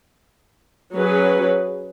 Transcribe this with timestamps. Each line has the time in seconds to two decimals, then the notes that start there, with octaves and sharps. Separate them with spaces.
0.93 F#3 C#4 G#4 B4